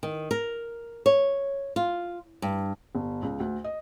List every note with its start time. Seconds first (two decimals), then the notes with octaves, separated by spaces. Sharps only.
0.03 D#3
0.31 A#4
1.06 C#5
1.76 F4
2.42 G2
2.95 G1
3.23 C#2
3.40 D2
3.64 D#5